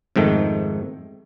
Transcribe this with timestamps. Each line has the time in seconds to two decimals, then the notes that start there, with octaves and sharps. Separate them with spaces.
0.16 F2 G#2 D#3 A3